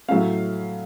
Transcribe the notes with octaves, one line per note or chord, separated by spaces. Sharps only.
A2 F#3 A3 C#4 F5